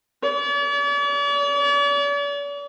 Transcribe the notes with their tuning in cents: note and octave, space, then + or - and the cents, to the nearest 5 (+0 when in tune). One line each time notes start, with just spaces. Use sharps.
D5 -45